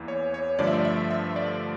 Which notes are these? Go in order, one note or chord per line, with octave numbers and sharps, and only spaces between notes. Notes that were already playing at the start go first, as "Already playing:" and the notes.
Already playing: E2 E3 A#3
C#5
C#5
G2 D3 F3 A3 D5
E5
D5
E5
E5
D5